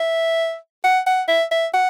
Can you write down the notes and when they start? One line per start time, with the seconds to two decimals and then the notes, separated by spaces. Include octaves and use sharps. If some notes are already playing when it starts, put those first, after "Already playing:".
Already playing: E5
0.84 F#5
1.07 F#5
1.28 E5
1.51 E5
1.74 F#5